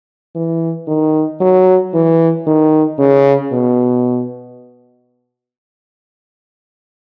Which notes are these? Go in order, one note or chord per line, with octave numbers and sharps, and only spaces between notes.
E3
D#3
F#3
E3
D#3
C#3
B2